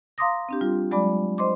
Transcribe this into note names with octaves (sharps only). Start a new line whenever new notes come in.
F5 A#5 C6 D6 D#6 A#6
C4 D4 G4
G3 F4
F#3 G#3 D5 B5 D6
C5 D#5 C6 D6